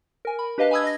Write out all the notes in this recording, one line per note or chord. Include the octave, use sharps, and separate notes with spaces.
A#4 G#5
B5
D4 G4 B4 D#5 F5 A5
G#5 A5 B5 D#6 E6 G#6
D#5 A#6